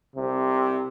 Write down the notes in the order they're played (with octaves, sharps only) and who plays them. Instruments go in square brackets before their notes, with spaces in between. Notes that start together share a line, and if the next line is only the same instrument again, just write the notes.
[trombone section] C2 C3